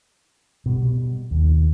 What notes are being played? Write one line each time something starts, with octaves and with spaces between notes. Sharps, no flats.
B2 G3
D#2